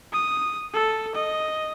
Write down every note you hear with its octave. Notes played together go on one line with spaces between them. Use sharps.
D#6
A4
D#5